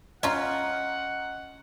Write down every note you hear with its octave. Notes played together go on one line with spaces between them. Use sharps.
C#4 F4 D#5 F#5 A#5 F6